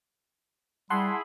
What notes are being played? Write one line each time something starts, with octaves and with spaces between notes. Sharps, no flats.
G3 E4 G#4 F#5 A5 B5 C6